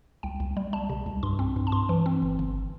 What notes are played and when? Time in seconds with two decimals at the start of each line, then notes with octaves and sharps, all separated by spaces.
0.23 C2 G5
0.40 C2
0.57 G3
0.73 G3 A5
0.89 C3
1.06 C2
1.23 G2 C6
1.39 C4
1.56 G2
1.67 A5
1.72 G2 C6
1.89 E3
2.06 C4
2.22 G1
2.39 G1